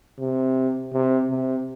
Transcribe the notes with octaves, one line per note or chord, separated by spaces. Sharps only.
C3
C3
C3